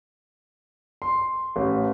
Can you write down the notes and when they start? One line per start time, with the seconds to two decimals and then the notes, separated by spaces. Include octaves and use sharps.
1.02 C6
1.56 A1